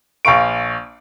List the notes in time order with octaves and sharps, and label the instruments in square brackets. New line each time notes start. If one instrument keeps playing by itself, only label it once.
[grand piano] A#1 F5 C#6 D7